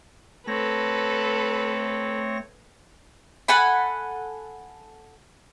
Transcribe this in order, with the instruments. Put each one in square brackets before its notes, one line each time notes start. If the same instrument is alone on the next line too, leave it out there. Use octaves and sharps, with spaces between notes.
[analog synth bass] A3 [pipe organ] C4 C#5 A#6 [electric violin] A4 B4
[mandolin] A4 F#5 G#5 B5